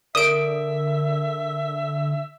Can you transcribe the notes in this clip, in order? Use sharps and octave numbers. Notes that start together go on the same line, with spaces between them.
D3 A4 A#4 D5 E5 D#6 D7